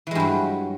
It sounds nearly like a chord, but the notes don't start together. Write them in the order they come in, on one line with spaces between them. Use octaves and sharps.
E3 G#3 G2 F#3